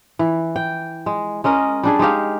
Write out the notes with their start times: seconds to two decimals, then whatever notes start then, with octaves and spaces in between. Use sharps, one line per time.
0.19 E3
0.56 G5
1.06 G#3
1.44 G#3 C#4 A#4 D#5
1.83 G3 D4 G#4
1.99 G#3 D#4 G4 F5